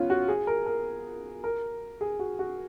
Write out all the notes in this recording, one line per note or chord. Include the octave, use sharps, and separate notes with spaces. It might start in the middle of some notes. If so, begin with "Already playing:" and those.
Already playing: B3 C#4 F4
F#4
G#4
A#4
A#4
A#4
G#4
F#4
F#4